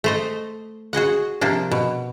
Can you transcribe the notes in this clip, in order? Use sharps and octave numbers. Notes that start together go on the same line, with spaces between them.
A3 C5 D#5
F#4 G#4 D#5 F#5
C3 F3 A#3 D4
B2